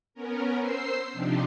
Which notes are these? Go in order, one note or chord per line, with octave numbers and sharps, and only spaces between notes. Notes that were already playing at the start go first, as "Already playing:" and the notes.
B3 C#4 A#4
C5 E6 C7
C3 F3 D4 D#4 G4